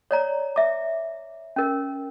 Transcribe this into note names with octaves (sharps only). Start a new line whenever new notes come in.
C#5 D5 A#5
E5 D6
C#4 A#4